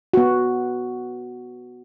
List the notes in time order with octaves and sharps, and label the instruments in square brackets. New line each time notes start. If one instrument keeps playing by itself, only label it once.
[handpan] B3 F#4